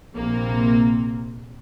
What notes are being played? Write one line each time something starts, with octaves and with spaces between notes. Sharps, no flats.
A#1 C3 A#3